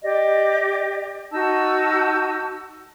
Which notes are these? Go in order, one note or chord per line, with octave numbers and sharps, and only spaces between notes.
G4 D5 D#5
D#4 F#4 A5 E6